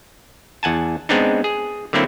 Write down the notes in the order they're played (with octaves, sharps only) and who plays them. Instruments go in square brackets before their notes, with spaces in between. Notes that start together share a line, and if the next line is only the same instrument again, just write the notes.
[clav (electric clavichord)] E2 F#5 G#5 A5
G#3 B3 C4 D4 D#4
G#4
D3 F#3 A#3 C4 E4